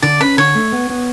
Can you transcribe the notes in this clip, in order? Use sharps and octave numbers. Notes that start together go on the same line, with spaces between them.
D3 D5
C#4 B4
D3 C#5
A3
B3
B3